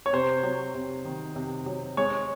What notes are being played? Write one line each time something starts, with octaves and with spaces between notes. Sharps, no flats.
C#5
C3 C5
F#3
C3
D#3
C3
F#3
G#3 C#5